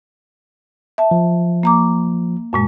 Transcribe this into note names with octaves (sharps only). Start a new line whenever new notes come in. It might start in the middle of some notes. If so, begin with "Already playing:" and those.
E5 A5
F3
A#3 A#5 D6
F#2 A#2 G#3